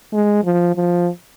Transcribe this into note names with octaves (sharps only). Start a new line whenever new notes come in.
G#3
F3
F3